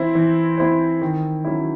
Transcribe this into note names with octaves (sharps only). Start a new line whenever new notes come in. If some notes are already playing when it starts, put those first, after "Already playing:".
Already playing: E3 C4 E4 C5
E3
C4 E4 C5
D#3
F#3 C#4 E4